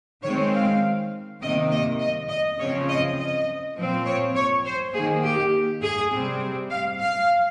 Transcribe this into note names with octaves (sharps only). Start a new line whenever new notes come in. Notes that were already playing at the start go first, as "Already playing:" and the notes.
D#3 G#3 C4 C#5
F5
C3 D#3 A#3 D#5
D#5
D#5
D#5
C#3 F3 C4 C#5
D#5
D#5
A#2 F3 C4
C#5
C#5
C5
D#3 A#3 G#4
G4
G#4
C3 G3 C4
F5
F5